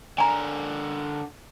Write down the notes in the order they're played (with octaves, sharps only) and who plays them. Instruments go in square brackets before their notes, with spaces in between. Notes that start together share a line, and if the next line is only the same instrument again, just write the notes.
[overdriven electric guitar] D3 A#4 [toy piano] G#5 A#5